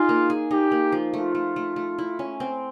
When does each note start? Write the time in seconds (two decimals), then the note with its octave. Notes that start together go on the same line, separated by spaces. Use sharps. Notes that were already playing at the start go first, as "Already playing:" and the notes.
Already playing: D#4 F4 G#4
0.09 A#3
0.30 G#4
0.51 D#4 G4
0.72 A#3
0.92 F3
1.14 A3 F4
1.35 A3
1.56 A3
1.76 A3
1.98 E4
2.19 C#4
2.40 C4